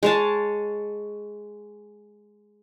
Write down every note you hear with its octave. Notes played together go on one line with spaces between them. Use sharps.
G#3 C#5 A5